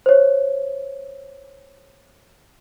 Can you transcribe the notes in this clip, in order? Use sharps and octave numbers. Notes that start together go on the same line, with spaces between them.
C5 C#5